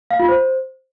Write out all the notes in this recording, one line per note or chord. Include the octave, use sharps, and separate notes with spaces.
F5
F4
C5